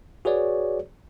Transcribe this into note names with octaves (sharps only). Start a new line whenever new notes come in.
F#4 G#4 B4 C#5 D5